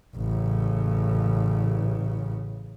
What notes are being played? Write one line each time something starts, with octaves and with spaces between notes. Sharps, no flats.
A1 C#3